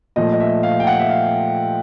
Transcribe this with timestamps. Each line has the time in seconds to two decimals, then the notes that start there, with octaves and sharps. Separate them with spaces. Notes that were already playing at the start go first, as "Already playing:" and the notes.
0.16 A#2 F3 A3 D#5
0.33 D#5
0.40 E5
0.63 F5
0.80 G5
0.87 F#5
0.99 E5
1.10 F5